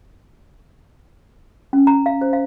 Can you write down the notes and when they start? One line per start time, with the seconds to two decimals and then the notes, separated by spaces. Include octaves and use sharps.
1.73 C#4
1.87 A#5
2.06 F5
2.21 C5
2.33 F5